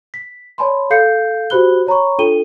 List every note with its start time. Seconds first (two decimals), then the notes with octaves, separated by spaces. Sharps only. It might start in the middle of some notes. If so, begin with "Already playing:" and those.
0.14 B6
0.58 C#5 D5 G#5 A5 B5 C6
0.90 A4 F5 G6 C7 C#7
1.50 F#4 G4 C5 B5 F#6 G7
1.87 C#5 A#5 B5 C#6
2.19 D4 F4 A4 G5 D#7 G7